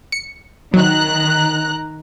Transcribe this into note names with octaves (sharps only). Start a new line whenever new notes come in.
C#7
D#3 F#3 A#5 F#6